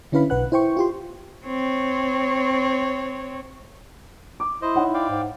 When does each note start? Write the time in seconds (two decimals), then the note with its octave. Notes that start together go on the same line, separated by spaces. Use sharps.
0.12 D3 C#4 E4 B4 F5 B5
0.30 B1 B4 F#5 F#6
0.52 E4 C5 G5 C#6
0.77 F4 G4 C6
1.46 C4 C#5
4.40 D6
4.62 E4 C5 D#5
4.76 D#4 C#5 F#5
4.94 D5 F5 G5
5.09 G#2